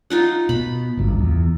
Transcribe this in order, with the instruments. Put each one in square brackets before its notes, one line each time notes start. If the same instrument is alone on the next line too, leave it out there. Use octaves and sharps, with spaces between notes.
[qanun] D#4 F4 F#5
[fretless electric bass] B2 [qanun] B5
[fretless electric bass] G#1 C#2 G2
E2